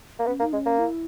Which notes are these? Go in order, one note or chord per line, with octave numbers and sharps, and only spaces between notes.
A#3
B3 C#4
A#3 D#4
G#3 C#4
A#3
E4